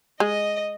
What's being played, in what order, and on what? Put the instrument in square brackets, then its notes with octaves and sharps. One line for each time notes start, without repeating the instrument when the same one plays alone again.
[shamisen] G#3 [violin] D#5